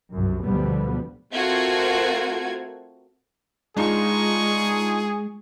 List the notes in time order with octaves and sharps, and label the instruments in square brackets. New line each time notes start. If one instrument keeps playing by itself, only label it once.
[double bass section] C2 F#2
D2 B2 D3 F3 G3 B3
[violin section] A3 C4 F4 F#4 A#4 G#6
[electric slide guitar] G#3 [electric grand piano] D4 D#4 F4 [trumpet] G#4 [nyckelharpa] C#6